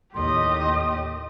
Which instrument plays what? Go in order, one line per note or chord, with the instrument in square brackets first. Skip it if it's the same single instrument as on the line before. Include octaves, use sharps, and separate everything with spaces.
[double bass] D#2 A2 [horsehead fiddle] G4 D#5 [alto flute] C6